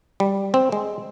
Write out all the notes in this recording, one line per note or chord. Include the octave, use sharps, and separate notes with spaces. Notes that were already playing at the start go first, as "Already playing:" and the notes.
G3
C4
G#3